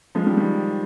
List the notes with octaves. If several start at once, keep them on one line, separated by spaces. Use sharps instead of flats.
F3 G#3
D#3 G3
D#3 G3